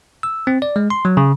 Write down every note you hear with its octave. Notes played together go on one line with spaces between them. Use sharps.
E6
C4
D5
G#3
C6
F#3
C#3